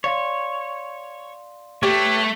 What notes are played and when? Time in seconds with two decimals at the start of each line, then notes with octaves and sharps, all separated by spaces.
0.04 C#5 D5 F5 C6
1.83 A3 G4 B4 C#5